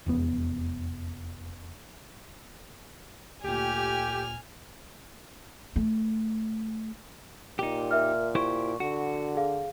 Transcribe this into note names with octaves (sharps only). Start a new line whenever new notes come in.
F1 E2 B3
D2 A#2 A3 G4 G#5 F6
A3
A#2 D#4 G4
A#4 E5 F6
E4 G4 C5 C#6
D3 F#4
G#4 F5